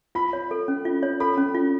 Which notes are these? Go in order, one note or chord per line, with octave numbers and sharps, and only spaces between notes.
F4 B5
C#5
A4
C#4
F4
C#5
A4 B5
C#4
F4